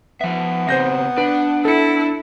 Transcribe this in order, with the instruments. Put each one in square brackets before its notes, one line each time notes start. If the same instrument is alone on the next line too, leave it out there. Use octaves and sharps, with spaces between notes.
[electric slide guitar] F3 E5 [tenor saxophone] B3
[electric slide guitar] C#3 C4 [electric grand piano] C5 G6 A#6
[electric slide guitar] D4 [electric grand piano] B4
[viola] E4 [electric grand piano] A4 C#7